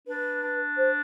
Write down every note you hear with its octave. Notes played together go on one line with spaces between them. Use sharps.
D4 B4
D4
C5